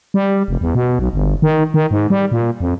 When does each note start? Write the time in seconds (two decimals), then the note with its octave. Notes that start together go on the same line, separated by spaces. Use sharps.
0.14 G3
0.48 F1
0.61 E2
0.75 B2
0.99 B1
1.13 G1
1.42 D#3
1.74 D#3
1.91 G#2
2.10 G3
2.32 A#2
2.60 F2